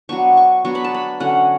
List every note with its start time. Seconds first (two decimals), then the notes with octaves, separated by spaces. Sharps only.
0.09 F#3 B3 D4 C#6
0.37 C#6
0.65 F#3 B3 D4 C#6
0.75 B5
0.84 A5
0.94 B5
1.20 D3 F#3 C#4 F#5